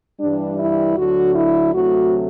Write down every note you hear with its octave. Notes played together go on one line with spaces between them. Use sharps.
G2 E3 G3 D4
E4
D2 D3 F#3 F#4
E4
D2 C3 F#3 A3 F#4